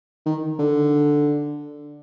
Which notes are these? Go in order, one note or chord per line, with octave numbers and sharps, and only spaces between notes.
D#3
D3